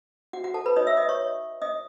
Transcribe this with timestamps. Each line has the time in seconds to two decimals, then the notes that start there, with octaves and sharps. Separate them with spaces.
0.33 F#4 F#5
0.44 F#4 F#5
0.54 A4 A5
0.66 B4 B5
0.76 D#4 F#4 C#5 D#5 D#6
0.87 E5 E6
0.97 D#5 D#6
1.09 C#5 C#6
1.62 D#5 D#6